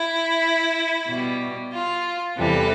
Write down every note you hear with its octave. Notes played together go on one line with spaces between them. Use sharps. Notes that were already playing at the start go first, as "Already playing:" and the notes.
Already playing: E4
B2 G3
F4
E2 C3 E3 G3 A4